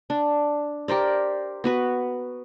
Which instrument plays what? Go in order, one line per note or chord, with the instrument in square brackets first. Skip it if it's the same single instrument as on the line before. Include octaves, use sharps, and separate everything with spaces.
[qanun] D4
G4 A#4 C5 D5
B3 F#4 B4